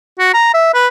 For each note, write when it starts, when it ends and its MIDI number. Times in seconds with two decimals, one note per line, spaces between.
0.19 0.30 66
0.34 0.52 82
0.54 0.70 76
0.74 0.87 71